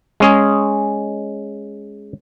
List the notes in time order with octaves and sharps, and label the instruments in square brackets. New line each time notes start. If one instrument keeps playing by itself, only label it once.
[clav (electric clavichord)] G#3 C#4 G#4